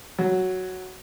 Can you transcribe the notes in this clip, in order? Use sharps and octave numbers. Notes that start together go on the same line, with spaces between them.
F#3